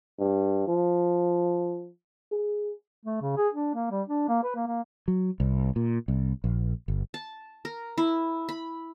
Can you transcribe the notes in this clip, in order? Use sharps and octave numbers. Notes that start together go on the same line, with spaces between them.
G2
F3
G#4
A3
C#3
G#4
D4
A#3
G3
D4
A#3
B4
A#3
A#3
F#3
C2
A#2
C2
A#1
G1
A5
A#4
E4
B5